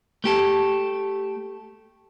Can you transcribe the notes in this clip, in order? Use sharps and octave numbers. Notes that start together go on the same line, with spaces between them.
A3 G4 A4